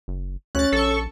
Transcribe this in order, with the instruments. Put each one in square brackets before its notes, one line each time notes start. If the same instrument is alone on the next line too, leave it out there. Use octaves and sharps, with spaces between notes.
[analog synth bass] F#1
[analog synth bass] D2 [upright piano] C#4 [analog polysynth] F#6 A6
[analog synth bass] A#1 [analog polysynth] A4 C#6